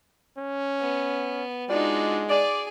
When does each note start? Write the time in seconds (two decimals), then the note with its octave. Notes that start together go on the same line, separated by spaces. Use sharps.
0.38 C#4
0.80 B3
1.69 G#3 D4 D#4 F4 F#4 D5
2.29 G#4 D5